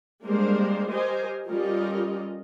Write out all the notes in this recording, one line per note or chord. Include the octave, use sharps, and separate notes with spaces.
G3 G#3 A#3 D4 A#4 C5
G4 A#4 C5 D#5 G#5
G3 C#4 F4 A4 A#4 D#5